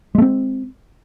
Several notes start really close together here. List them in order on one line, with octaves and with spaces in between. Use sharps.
G#3 A3 C4